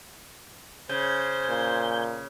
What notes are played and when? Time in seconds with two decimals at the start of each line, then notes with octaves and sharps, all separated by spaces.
0.89 C#3 C5 G#5 G6
1.49 A#2